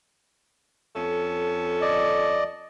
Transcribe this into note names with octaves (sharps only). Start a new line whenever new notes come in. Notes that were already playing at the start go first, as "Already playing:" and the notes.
F2 C#4 A4
D5 D#5